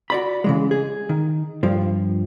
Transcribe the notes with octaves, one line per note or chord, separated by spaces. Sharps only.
F#4 D5 B5
C#3 E3 G#3
G#4
D#3
G2 F3